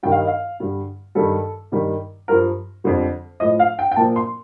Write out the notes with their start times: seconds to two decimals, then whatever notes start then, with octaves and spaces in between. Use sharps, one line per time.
0.03 G2 D#3 G3 G5
0.12 F5
0.19 D#5
0.27 F5
0.60 G2 D3 G3
1.15 G2 D#3 G3 A4
1.72 G2 D#3 G3
2.28 G2 F3 A#4
2.84 F2 D3 G3
3.40 A2 F3 D#5
3.59 F5
3.79 G5
3.91 G5
3.96 A#2 F3 A5
4.16 C6